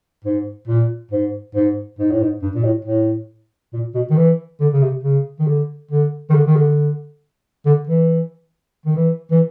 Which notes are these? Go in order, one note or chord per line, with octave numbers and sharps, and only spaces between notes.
G#2
A#2
G#2
G#2
G#2
A2
G#2
G2
A#2
A2
A2
A#2
B2
D#3
E3
D3
C#3
C3
C#3
D#3
D3
D3
D#3
D3
D#3
D3
D3
E3
D#3
E3
E3